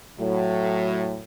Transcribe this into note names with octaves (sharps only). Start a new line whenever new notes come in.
A2 F#3